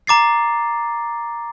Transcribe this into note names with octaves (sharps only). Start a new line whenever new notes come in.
A#5 D6 A6 C7